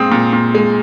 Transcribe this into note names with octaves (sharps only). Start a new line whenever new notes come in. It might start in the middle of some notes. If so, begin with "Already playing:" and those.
Already playing: A#2 G#3 C4 D#6
A#2
A#2
G#3